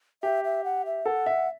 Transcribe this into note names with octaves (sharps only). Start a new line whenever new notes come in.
G4 E5
E5
F#5
E5
A4 F#5
E5